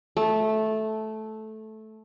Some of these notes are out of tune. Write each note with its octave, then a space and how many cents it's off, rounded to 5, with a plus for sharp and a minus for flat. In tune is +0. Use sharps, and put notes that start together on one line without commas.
A3 -10